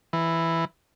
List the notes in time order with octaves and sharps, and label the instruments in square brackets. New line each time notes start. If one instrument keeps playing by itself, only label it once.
[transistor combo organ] E3